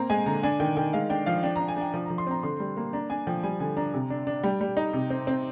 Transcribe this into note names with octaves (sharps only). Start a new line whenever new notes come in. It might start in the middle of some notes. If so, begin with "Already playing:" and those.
Already playing: A#3 C4 A#5
G#3 G#5
D3 A#5
D4 G#5
D#3 G5
D#3 G5
G#3 F5
D4 G5
F3 F5
D4 G5
A#5
D4
G#5
D4 G5
F3
A#5
F3
C6
C4 A#5
D3 C6
G3
A#3
D4 A#5
D4 G#5
F3 G5
G3 G#5
D3 G#5
D4 A#5
C3
D4
D4
G3 G5
G3
D#4
C3
C4
C4